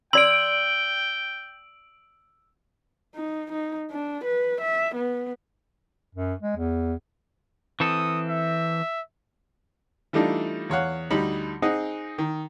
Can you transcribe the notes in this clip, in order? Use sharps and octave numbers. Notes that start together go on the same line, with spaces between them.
D5 G5 C6 E6 D7 F#7
D#4
D#4
D4
B4
E5
B3
F#2
G#3
E2
E3 C4 A4 D#6
E5
E3 G3 A3 D4 D#4 F4
E2 C#5 F5 F#5
D2 G3 D#4 B5
C4 D#4 G#4 D#5 F#5
D#3